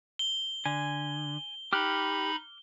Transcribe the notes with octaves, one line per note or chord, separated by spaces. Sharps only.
G7
D3 G#5
D#4 G4 B5 D6 F6 F#6